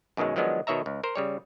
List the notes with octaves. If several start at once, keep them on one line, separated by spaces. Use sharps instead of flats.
F#2 B2 D#3 F#3 G#3
D#3 F3 F#3 G#3 B3 D4
B2 D#3 C#5 E5 A#5
C#2
A#4 C5
C#3 G3 C#5